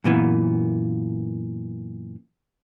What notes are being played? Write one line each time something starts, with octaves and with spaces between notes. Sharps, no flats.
F#2 A#2 E3 B3